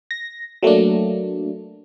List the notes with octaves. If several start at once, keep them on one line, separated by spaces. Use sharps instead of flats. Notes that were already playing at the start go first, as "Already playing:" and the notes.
A#6
F#3 A3 A#3 D4